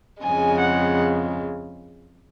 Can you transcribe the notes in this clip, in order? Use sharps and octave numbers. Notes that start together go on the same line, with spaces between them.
F2 C#3 G#3 G#5
F#5